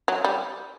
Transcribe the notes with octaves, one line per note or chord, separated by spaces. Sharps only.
F#3
G3